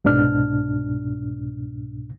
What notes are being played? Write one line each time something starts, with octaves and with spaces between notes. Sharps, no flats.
C2 G#2 B2 D4 F6